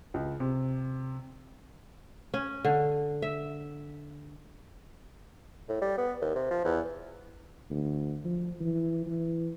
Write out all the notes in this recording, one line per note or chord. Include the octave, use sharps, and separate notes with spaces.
C#2
C3
C#4
D3
E5
A2
G3
B3
D#2
C3
F3
E2
D2
F3
E3
E3